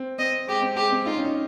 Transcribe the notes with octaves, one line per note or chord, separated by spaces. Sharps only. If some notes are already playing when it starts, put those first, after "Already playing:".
Already playing: C4
C4 D#5
G#3 G4
C4
G#3 G4
C4
D#4 F4
C#4
D#4